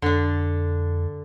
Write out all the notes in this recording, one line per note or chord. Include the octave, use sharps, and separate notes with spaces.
F2 D3 D4